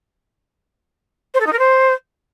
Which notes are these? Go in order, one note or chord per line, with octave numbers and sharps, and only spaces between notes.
C5
A4
D#4
A#4
C5